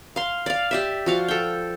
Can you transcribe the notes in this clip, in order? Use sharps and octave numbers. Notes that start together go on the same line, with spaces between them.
F5 C6
D5 F5
G4 D5 E5
F3 F#4 F5
A4 G5